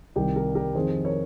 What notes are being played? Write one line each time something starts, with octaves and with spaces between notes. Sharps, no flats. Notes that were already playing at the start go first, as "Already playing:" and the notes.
C2 C3 D#3 G4 A#4
G4 A#4
G4 A#4
F2 D#3 G#4 C5
A#4 C#5